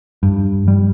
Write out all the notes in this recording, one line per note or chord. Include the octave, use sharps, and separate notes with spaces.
G2
G3